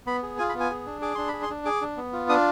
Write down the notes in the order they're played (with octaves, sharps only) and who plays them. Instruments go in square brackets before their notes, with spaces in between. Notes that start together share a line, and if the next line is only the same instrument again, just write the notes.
[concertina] B3 B5
G#4
F4 G#5
B5
B3
G#5
G#4
D4
G#4 D6
D4 C6
G#4 B5
C6
D4
G#4 D6
D4
B3
F4
D4 D#6